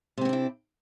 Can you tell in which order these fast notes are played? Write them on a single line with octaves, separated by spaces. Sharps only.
C3 C4 B3 D4 E4